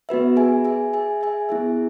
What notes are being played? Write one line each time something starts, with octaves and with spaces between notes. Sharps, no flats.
B3 F#4 B4 E5
G#4 E5 G#5
G#4 E5 G#5
G#4 E5 G#5
G#4 E5 G#5
B3 E4 G#4 E5